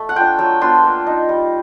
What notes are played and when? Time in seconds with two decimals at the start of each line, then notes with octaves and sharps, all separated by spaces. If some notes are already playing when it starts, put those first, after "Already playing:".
Already playing: A3
0.09 F#5
0.16 D4 F4 G5
0.39 F#3 G5
0.61 B3 D4 F4 C6
0.84 A#3
1.06 D#4
1.29 G3